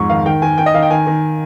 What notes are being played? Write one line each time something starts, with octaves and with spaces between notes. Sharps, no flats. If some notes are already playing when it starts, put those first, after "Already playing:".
Already playing: F2 G#2 C#6
D#3 F5
D#3 G5
D#3 G#5
D#3 G5
D#5
D#3 F5
G5
D#3 G#5
D#3